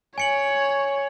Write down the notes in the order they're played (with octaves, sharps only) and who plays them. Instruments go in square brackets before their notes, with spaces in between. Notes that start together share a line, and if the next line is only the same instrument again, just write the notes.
[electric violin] C#5 [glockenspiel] G#5 C#7 F#7